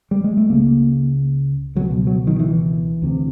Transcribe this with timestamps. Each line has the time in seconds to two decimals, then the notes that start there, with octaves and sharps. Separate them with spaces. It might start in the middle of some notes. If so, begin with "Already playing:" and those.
0.11 G3
0.24 G#3
0.37 A3
0.50 C#2 C#3 A#3
1.75 C#2 B2 F#3
2.07 F#3
2.27 D#3
2.39 E3
3.02 D2 C3